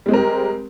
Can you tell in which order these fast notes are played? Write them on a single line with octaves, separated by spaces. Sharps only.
G3 G#3 C4 A#4 G4